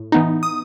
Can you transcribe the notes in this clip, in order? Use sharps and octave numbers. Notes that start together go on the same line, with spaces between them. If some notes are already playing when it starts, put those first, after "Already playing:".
Already playing: A2
E3 B3 D#4
D#6